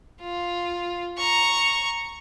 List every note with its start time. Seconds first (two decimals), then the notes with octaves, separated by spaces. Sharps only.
0.21 F4
1.18 A#5 C#6